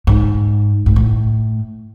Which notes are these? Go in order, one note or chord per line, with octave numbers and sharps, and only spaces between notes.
G#2
G#2
A2